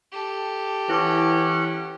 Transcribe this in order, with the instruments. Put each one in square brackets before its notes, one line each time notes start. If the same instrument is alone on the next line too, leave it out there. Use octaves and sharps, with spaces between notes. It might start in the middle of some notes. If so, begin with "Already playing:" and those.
[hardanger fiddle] G4 A4
[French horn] E3 [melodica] C#4 F#5 [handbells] E4 D6